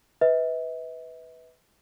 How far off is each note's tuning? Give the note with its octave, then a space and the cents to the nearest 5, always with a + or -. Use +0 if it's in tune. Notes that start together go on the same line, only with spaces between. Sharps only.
B4 +5 E5 -45